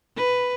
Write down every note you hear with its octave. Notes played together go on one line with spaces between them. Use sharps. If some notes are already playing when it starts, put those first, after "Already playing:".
B4